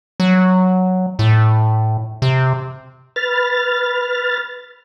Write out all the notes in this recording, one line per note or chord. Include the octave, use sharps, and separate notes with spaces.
F#3
A2
C3
B4 F6 A6